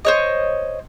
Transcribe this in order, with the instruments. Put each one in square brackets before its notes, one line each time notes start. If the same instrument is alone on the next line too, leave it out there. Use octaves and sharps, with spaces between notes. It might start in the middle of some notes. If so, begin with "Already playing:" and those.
[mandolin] C5 C#5 D#5